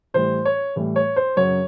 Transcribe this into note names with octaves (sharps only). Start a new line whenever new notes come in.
A2 E3 G3 C5
C#5
A2 E3 G3
C#5
C5
F#2 C#3 F#3 C#5